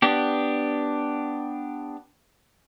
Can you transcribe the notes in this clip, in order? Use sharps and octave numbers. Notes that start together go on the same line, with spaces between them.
B3 D4 G4